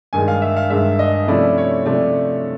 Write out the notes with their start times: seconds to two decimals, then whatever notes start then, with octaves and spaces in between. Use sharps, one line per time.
0.13 G2 D#3 G#3 G#5
0.28 F5
0.42 E5
0.56 F5
0.70 G2 D#3 G#3 E5
0.99 D#5
1.28 C3 F3 A3 C#4 E4 D5
1.58 C#5
1.85 C3 F3 A3 D5